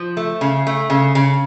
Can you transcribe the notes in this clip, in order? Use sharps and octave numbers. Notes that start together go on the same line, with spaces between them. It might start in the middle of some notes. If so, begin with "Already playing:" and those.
Already playing: F3
A3
C#3
A3
C#3
C#3